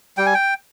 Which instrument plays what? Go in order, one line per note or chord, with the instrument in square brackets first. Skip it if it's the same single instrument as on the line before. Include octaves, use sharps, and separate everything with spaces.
[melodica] G3 G5
G#5
G5